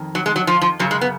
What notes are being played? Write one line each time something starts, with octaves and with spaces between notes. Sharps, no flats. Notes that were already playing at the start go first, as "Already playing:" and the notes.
Already playing: F2 D#3
F#3
G#3
F#3
F3
F3
F#2 C#3 F#3
G#3
B3